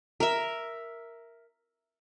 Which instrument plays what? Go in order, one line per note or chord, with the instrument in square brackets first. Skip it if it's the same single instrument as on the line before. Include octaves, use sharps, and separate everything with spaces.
[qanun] A#4 E5